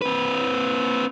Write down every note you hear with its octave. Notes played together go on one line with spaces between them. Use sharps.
C4 B4